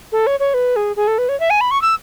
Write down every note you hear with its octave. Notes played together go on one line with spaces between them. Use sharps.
A4
C#5
C#5
B4
G#4
G#4
A4
B4
C#5
E5
G#5
B5
C#6
E6